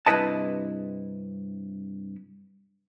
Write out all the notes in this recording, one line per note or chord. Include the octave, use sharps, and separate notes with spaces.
G2 C3 E4 B4 D#5 A5